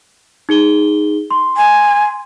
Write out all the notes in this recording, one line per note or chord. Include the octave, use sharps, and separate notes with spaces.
D#4 G#4 G7
C6
G#5